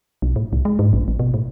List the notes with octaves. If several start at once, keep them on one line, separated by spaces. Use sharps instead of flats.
B1
A2
C2
G#3
G#2
A#1
A1
B2
A2